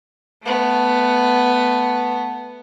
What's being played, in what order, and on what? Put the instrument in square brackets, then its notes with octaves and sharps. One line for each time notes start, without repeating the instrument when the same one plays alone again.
[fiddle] A3 B3